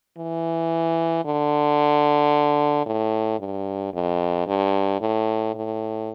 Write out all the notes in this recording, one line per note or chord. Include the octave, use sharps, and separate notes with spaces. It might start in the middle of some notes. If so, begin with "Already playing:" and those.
E3
D3
A2
G2
F2
G2
A2
A2